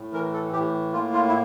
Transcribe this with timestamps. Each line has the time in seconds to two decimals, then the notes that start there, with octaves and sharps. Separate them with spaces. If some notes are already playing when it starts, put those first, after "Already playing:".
Already playing: A2
0.13 E3 A#4
0.33 A4
0.53 A2 G4
0.92 A#3 F4
1.13 F4
1.28 E4